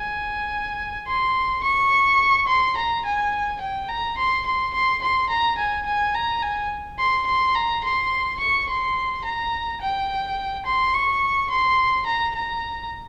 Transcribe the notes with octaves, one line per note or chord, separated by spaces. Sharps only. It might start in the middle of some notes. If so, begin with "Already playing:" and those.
Already playing: G#5
C6
C#6
C6
A#5
G#5
G5
A#5
C6
C6
C6
C6
A#5
G#5
G#5
A#5
G#5
C6
C6
A#5
C6
C#6
C6
A#5
G5
C6
C#6
C6
A#5
A#5